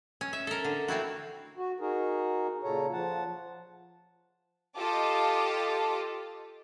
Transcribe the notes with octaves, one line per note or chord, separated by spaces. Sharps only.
C#4
E5
A4 A#4
D3
A3 C4 E4 F#4
F#4
D#4 F#4 G#4 A#4
A#2 C#3 A4 C#5 A#5
F3 F#5 A5
F4 G4 A4 D#5 A5 D6